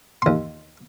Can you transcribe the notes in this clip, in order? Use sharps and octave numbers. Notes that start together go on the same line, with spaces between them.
D#2 C6